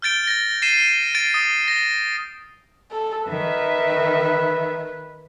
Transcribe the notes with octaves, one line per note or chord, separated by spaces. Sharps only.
F6 G6 A6 D7 G7
A6 A#6
A6 C7 D#7 E7
A6 D7
D#6
A#6
A4
D#3 B4 E5